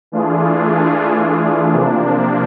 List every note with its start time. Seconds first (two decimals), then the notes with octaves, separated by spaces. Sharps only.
0.12 E3 A3 D4 F4 G#4
1.72 C3 F3 A#3 D4